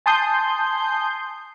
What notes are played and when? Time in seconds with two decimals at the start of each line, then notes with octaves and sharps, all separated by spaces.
0.06 G#5 A5 C6 D#6 G6 C7